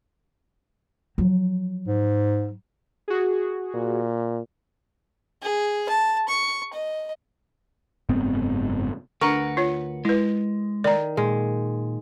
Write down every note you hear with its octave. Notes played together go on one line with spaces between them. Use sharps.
F3 F#3
G#2
F#4 G#4
A#2
G#4
A5
C#6
D#5
F#1 G#2 B3 C4
D2 D4 A#4 B4 F#5 A#5 C#6
F4 C#5
G#3 E4 B4
D#3 D5 A#5
A#2 G#3